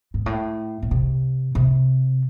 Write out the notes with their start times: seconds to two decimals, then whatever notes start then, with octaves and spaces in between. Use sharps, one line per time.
0.14 G#2
0.26 A2
0.83 A2
0.91 C3
1.55 C3